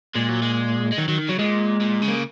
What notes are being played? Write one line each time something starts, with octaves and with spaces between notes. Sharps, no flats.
A#2 G#3
F#3
G#3
G#3
D#3 F#3
D#3 F#3
D#3
C#3 F#3
A#2 G#3
A#2
C#3
A#3